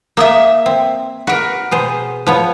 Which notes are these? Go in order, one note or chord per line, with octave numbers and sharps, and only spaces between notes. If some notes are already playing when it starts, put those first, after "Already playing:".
A#3 E5 D#6 E6
C4
F#4 A#4 B4
B2 G#4 C5
F3 B3 C#5